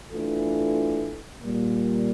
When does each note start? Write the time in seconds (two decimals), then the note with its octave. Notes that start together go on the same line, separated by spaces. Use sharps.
0.12 E3 A3 D4 F4 A4
1.41 A#2 G3 A#3